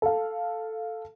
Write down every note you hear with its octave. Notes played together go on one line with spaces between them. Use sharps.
A4 F5